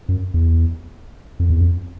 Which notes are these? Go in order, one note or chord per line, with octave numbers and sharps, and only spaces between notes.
F#2
E2
F2
E2
F2